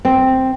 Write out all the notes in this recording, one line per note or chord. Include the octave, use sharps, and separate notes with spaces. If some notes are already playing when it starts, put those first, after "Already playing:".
C4